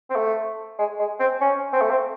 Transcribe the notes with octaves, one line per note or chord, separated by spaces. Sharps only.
C4
A3
G#3
G#3
C4
C#4
C4
A3
C4